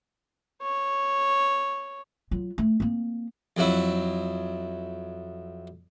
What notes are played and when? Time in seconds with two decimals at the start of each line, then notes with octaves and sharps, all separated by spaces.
0.62 C#5
2.31 F#3 F4
2.58 A3
2.80 A#3 C4
3.57 F2 F#3 E4